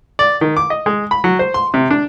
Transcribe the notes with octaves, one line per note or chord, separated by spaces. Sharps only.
D5
D#3
D6
D#5
G#3
B5
F#3
C5
C6
C3
D4